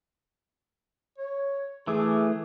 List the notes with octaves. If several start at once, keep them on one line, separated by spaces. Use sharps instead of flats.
C#5
E3 A3 G#4 D6